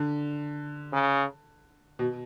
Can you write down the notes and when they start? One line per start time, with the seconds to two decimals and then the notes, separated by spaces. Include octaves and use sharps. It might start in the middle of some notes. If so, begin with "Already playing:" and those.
Already playing: D3
0.93 C#3
1.99 B2